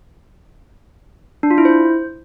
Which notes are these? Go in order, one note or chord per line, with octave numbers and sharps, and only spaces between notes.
D4
F4
E4
C5